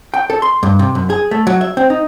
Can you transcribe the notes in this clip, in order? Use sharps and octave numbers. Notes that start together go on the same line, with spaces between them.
G5
A4
C6
G2
C3
F#2
G#4
A3
F#3
E5
C4
D#4